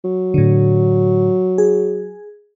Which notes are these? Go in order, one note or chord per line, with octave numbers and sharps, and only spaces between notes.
F#3
A2 D3
G#4